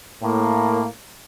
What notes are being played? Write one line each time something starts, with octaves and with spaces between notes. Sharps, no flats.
A2 A#3